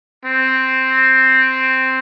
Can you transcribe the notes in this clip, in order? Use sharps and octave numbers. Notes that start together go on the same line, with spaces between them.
C4